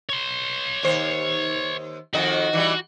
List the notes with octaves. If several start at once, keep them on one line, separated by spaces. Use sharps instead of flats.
C#5 C6
D#2 C5
F2 D#3 F#4 D#5
E3 F#3 G3